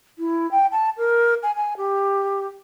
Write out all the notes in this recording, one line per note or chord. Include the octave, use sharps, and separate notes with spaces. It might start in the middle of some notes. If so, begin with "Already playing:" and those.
E4
G5
A5
A#4
G#5
G#5
G4